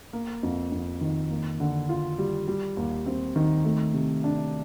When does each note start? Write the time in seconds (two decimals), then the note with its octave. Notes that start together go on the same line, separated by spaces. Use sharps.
0.13 A#3
0.43 F2
0.72 F2
1.01 D#3
1.31 A#3
1.60 D3
1.89 F4
2.18 G3
2.48 G3
2.77 D#2
3.06 C4
3.36 D#3
3.65 A3
3.94 C3
4.24 D4